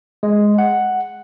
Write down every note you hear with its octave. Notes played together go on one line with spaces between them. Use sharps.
G#3
F#5